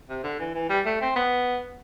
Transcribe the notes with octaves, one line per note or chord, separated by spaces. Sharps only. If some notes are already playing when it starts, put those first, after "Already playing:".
C3
D3
E3
E3
G3
A3
C4
B3